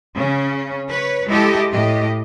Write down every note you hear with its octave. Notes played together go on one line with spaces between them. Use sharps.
C#3 C#4
B4 C#5
G#3 E4 G4 A4 D#5
A2 G4 D#5